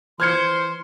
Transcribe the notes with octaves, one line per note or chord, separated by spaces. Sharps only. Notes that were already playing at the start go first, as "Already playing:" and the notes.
E3 C5 C6 F6 G#6 C#7